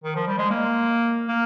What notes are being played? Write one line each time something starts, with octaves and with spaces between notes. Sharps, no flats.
D#3
F3
G3
G#3
A#3
A#3